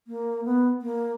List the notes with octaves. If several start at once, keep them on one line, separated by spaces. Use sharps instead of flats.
A#3
B3
A#3